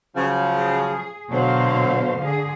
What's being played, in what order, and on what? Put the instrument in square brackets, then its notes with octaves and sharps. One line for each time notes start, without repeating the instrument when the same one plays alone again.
[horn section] C#3 F3 F#3
[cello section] G#4
[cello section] B2 C5 F5 [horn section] D3 F#3
[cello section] D3 G#4